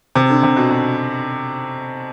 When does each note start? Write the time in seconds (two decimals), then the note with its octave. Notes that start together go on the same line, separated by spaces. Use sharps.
0.16 C3
0.30 D3
0.43 C3
0.57 B2
0.70 B2